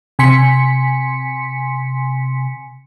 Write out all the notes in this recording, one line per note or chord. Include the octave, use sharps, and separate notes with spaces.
C3 G#5 C6 B6 C#7